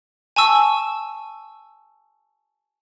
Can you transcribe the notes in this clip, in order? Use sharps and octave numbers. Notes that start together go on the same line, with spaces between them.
G#5 A5 C#6 E6